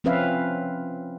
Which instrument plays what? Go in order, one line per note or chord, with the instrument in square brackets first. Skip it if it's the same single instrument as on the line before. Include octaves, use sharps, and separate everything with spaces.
[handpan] F3 C4 C#4 B4 E5 F5